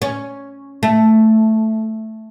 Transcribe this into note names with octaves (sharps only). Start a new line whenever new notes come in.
C#4
A3